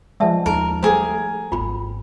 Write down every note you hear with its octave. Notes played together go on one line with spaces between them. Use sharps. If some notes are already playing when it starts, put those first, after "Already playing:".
F3 G#3 D5 E5 A5
D#2 A#3 D#4 A#4 A5
G3 A3 G4 G#4 A#4 C5
G#1 C4 F4 B5